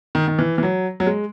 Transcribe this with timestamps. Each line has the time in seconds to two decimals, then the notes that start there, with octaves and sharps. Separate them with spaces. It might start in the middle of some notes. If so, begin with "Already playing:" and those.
0.15 D#3
0.28 D#3
0.39 E3
0.58 E3
0.63 F#3
1.00 F#3
1.07 G#3